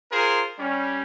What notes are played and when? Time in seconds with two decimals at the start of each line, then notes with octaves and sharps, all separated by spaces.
0.11 F4 G#4 A#4 C5
0.58 G3 C#4